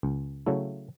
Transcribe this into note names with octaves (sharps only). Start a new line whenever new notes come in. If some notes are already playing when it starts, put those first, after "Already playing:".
C#2
C#3 F#3 A3 E4